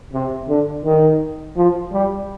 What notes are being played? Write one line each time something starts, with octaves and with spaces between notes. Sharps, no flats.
C3
D3
D#3
F3
G3